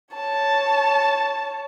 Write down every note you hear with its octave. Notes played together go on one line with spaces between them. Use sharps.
C#5 A5